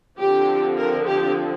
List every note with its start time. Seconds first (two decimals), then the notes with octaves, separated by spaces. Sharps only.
0.18 D3 F3 C4 G4
0.77 A#4
1.07 G4